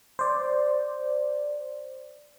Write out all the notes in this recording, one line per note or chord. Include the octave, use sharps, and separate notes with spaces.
C5 D5